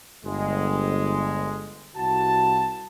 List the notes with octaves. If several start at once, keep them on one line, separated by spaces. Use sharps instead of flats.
G1 G#3
C2 F#4 A5